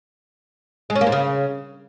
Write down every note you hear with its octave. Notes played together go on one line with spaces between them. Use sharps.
G#3
C#4
A#3
G#2
C#3